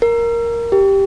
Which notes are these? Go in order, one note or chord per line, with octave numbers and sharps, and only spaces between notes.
A#4
G4